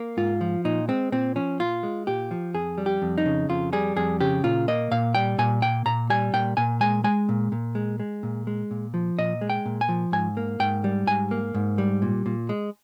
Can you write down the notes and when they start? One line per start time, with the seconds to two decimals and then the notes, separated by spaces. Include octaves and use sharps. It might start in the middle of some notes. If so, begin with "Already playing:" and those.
Already playing: A#3
0.17 G#2 F4
0.41 F3
0.65 A#2 D#4
0.88 G#3 C4
1.12 A#2 C4
1.36 F3 C#4
1.59 A#2 F4
1.83 G#3
2.07 A#2 G4
2.31 F3
2.54 F2 G#4
2.78 G3
2.86 G4
3.02 F2
3.18 D#4
3.26 C#3
3.49 F2 F4
3.73 G3 G#4
3.96 F2 G#4
4.20 C#3 G4
4.44 A#2 F4
4.68 A#3 D#5
4.91 A#2 F5
5.15 G3 G5
5.38 A#2 G#5
5.62 A#3 G5
5.86 A#2 A#5
6.10 G3 G#5
6.34 A#2 G5
6.57 A#2 G#5
6.81 G#3 G#5
7.04 G#3 G#5
7.29 A#2
7.52 A#2
7.75 G#3
8.00 G#3
8.23 A#2
8.47 G#3
8.71 A#2
8.94 F3
9.18 A#2 D#5
9.41 G#3
9.50 G5
9.66 A#2
9.81 G#5
9.89 F3
10.12 G#2 G#5
10.37 A#3
10.60 G#2 G5
10.84 G3
11.07 G#2 G#5
11.31 A#3
11.55 G#2
11.78 G3
12.02 A#2
12.26 A#2
12.49 G#3